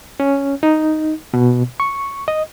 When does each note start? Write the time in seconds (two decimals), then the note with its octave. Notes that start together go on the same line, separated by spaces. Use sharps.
0.20 C#4
0.63 D#4
1.34 B2
1.80 C#6
2.28 D#5